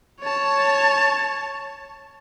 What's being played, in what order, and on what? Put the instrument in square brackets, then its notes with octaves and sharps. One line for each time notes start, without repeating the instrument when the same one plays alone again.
[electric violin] C#5 A5